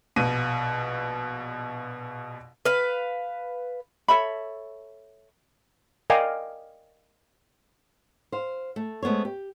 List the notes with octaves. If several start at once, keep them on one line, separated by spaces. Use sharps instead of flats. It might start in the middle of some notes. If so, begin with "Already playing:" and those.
A#1 B2 D#7
B4 F5
A4 C#5 E5 B5
A#4 D5 D#5 F5 G5 G#5
C5 F5
A3
G#3 A3 B3 C5 C#5
G4